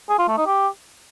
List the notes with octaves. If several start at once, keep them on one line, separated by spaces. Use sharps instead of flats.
G#4
F4
A3
D#4
G4